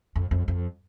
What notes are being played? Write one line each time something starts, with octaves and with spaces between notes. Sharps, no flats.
F2
F2
F2